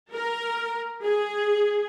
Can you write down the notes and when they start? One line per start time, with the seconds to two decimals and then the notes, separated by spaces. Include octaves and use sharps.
0.12 A#4
1.02 G#4